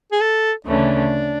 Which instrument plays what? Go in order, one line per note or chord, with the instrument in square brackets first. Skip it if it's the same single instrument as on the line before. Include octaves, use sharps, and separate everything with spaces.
[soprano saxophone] G#4
A4
[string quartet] D2 C#3 E3 A3 C#4 [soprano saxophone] D4